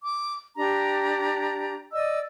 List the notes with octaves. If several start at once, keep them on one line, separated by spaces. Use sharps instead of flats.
D6
D4 G4 A#5
D5 D#5 E6